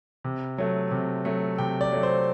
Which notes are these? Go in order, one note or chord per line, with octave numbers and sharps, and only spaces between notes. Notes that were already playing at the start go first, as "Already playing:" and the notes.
C3
F#3 A3
C3
F#3 A3
C3 G5
D5
F#3 A3
C5